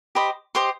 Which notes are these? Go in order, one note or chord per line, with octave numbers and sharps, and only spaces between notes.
G4 C5 D#5 B5
G4 C5 D#5 C6